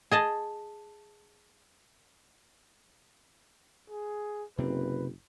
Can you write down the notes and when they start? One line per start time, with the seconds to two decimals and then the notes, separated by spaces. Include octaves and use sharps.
0.11 G#4 D#5 A5
3.90 G#4
4.58 F#1 C3 C4 B4